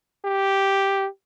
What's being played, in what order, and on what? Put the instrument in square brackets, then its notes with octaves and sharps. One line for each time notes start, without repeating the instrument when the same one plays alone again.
[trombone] G4